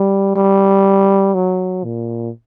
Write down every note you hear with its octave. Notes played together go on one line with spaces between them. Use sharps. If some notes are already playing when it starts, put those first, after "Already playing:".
Already playing: G3
G3
F#3
A#2